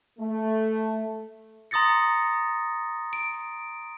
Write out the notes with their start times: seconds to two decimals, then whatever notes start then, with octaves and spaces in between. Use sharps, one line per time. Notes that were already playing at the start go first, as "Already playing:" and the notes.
0.19 A3
1.71 A#5 C6 D#6 A6 A#6 C#7
3.13 D7